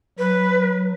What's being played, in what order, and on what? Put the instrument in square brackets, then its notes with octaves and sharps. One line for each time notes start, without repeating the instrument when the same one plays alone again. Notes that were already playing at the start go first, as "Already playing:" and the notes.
[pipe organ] F#3 [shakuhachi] B4